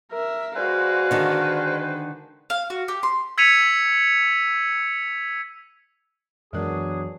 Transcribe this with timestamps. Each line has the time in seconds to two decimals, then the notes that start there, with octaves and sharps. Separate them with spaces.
0.11 A#4 E5
0.56 G#3 F#4 B4 C5 D5 F5
1.11 D3 D#3
2.50 F5
2.70 F#4
2.88 G4
3.03 C6
3.38 E6 G#6 B6 C#7 D#7 F7
6.53 F#2 E3 F#3 G#3 B3 D4 G#4 A#4